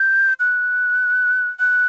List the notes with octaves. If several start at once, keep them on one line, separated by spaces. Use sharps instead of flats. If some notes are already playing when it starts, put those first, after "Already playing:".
Already playing: G6
F#6
F#6